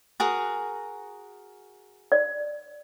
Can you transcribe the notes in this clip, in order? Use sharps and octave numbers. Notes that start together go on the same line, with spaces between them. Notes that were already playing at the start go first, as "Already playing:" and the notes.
F#4 G#4 A#4
D5